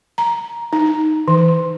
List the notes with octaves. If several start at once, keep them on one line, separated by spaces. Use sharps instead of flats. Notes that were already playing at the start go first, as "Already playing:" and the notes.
A#5
D#4
E3